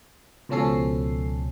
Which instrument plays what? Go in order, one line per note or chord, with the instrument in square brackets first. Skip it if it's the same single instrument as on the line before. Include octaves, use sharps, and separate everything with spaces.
[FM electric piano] C#2 B2 F3 C#4 A4 C7